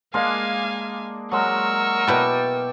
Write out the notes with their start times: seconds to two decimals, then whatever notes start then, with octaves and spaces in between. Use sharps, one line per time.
0.14 G#3 A#3 D4 F5 G#5
1.32 F#3 G#3 A#4 C#6 E6
2.07 B2 E4 F#4 D5 G5 A5